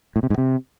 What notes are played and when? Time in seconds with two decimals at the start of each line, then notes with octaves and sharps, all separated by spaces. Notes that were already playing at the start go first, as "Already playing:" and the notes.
0.16 A2
0.23 C3
0.30 G#2
0.38 C3